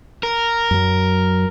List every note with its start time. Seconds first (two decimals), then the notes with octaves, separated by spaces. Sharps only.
0.23 A#4
0.71 F#2 F#3